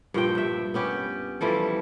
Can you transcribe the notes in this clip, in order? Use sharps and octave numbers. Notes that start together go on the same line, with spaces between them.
G2 A#2 F3 G5
G2 E5
B3 C#4 G4
E3 F3 G3 A4